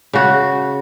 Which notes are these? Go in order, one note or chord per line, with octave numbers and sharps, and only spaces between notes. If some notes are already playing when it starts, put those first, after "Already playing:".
C#3 F#4